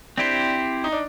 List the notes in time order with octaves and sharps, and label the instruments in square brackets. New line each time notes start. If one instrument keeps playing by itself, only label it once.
[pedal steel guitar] C4 E4 G4 C5 [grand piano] D4
[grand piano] D#4
D4